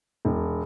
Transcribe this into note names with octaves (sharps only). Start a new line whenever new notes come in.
E1